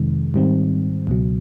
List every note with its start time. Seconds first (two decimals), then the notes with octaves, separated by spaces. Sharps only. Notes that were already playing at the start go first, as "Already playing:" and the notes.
Already playing: F2 C3 D#3 G#3
0.34 G#2 D#3 G3 C4
1.07 C#2 B2 F#3